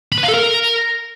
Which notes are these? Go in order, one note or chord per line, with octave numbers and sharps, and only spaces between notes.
B5
B4
F5
A4
A#4